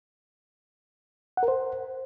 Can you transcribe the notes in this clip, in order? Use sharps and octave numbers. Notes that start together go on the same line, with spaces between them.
F#5
A#4
C5